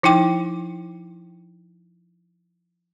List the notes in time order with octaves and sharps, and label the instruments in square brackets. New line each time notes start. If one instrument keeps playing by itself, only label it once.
[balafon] F3 D#4 E4 G5 D6